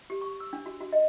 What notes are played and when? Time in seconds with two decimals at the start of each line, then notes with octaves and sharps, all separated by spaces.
0.10 G4
0.21 C#6
0.40 E6
0.53 D4
0.66 F#4
0.80 F#4
0.92 D#5